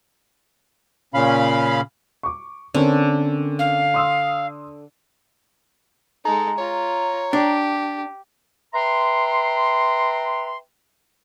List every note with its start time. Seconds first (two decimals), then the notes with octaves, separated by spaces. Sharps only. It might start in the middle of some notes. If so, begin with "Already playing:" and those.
1.14 A#2 C#3 C#4 F5 B5
2.23 C#6 D6
2.74 D3 C4 C#4 A#4
3.59 F5
3.94 C6 D#6 E6
6.25 G#3 D#4 A4 A#5
6.58 F4 C#5
7.33 D4 G4
8.74 B4 E5 G5 A#5 C6